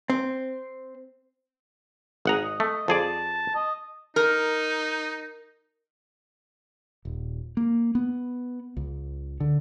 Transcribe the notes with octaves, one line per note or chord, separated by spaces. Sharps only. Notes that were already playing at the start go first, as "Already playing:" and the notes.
C4
G#1 G#4 F#5 A#5
D#5
A3
F2 G#4 D5 A5
D#5
D#4 A#4
D#1
A#3
B3
C#2
D3